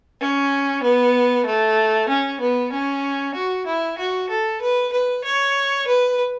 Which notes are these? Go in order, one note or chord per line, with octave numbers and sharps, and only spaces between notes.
C#4
B3
A3
C#4
B3
C#4
F#4
E4
F#4
A4
B4
B4
C#5
B4